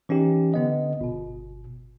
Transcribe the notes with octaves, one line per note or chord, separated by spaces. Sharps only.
E3 C#4 D#4 G4
D3 B3 D#5
G1 B2